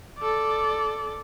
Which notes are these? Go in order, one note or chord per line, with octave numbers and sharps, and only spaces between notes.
A4 D5